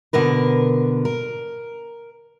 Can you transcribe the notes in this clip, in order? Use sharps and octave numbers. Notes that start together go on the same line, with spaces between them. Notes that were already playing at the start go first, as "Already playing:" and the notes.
B2 D3 A#4 B4
A#4